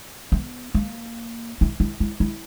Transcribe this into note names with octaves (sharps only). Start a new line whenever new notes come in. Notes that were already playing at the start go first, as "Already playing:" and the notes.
B3
A#3
E4
E4
E4
E4